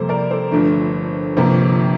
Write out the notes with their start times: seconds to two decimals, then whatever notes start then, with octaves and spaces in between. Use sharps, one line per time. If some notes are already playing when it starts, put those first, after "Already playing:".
Already playing: F2 C3 G3 A#3 A4 C5
0.09 A#4 D5
0.30 A4 C5
0.52 G1 G2 F3 A3
1.37 G1 F2 C3 F3 A#3